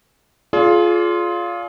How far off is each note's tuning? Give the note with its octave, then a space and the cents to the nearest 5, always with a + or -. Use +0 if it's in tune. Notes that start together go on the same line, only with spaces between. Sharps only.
F4 +0 G#4 +35 D5 -35